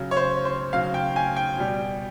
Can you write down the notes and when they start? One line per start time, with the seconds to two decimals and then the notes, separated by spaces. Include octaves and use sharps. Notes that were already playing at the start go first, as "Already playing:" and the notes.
Already playing: C#3 F#3
0.11 C#5
0.17 C5
0.45 C5
0.73 C#3 F#3 F5
0.94 G5
1.16 G#5
1.36 G5
1.58 B2 G3